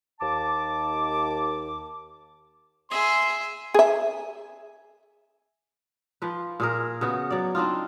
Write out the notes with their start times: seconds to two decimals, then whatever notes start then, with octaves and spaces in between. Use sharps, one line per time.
0.20 D#2 A5 D6
2.91 G#4 E5 C6
3.74 G#4 E5
6.22 F3 B4
6.60 A#2 G#4 A#4
7.01 C#3 B3 F#4
7.30 F#3 D5
7.55 C4 D4 D#4 F4